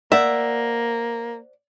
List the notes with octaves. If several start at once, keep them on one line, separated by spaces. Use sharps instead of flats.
A#3 C5 D5 E5 F#5